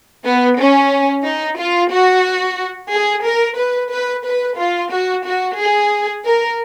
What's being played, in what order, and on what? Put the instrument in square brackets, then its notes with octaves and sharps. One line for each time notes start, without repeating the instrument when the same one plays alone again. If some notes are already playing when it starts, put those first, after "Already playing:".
[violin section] B3
C#4
D#4
F4
F#4
G#4
A#4
B4
B4
B4
F4
F#4
F#4
G#4
A#4